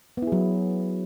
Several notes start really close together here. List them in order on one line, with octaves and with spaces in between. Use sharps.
B3 E4 G#4 F#3